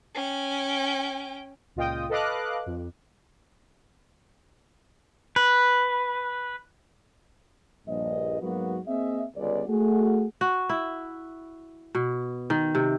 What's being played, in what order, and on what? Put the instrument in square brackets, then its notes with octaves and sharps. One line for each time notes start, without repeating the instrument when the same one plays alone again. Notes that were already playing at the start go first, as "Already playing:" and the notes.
[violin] C#4 G5
[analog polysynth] C#2 A#2 F4 D#5 G5 D#6
A4 B4 D#5 F5 D6 F#6
F2
[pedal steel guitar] B4
[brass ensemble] A#1 G2 D#5
G#2 F#3 A#3 B3 F#4
A#3 C4 G#4 D#5 E5
G1 C#2 D5
A3 F#4 G#4
[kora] F#4
E4
B2
D#3
C3